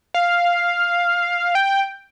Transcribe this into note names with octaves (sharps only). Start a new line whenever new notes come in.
F5
G5